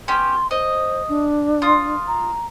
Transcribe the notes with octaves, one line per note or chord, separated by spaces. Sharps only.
B3 C#4 G4 C6
C5 D#5
D4
F4 D#6
A#5